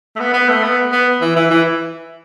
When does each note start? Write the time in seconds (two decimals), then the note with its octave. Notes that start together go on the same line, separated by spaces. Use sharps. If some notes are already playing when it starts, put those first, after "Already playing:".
0.16 A3
0.20 B3
0.34 B3
0.49 A3
0.64 B3
0.92 B3
1.21 E3
1.36 E3
1.51 E3